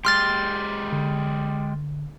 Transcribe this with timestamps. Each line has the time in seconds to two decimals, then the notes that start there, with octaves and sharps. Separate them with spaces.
0.05 G#3 G4 C6 F6 A6
0.93 D3